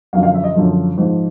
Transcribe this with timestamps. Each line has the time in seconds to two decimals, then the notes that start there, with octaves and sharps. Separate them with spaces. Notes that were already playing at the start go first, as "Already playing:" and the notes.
0.13 F#2 D3 F3 F5
0.23 F5
0.34 E5
0.44 D#5
0.55 F#2 D3 F3
0.97 G#2 F3